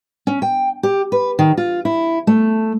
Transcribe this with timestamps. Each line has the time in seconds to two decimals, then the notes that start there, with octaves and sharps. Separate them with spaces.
0.27 C#4
0.42 G5
0.83 G4
1.12 B4
1.39 D#3
1.57 F4
1.85 E4
2.27 A3